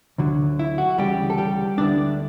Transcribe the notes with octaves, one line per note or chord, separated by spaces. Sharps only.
D2 D3 F#3
E4
F#4
D2 C#3 E3 G3 G4
A4
G3 G4
D2 D3 G3 B3 D4 E4 D5